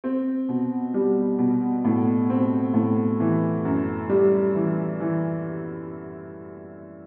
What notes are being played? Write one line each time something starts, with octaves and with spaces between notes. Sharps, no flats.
C4
B2
G3
B2
A2
C4
A2
E3
F#2
G3
E3
E3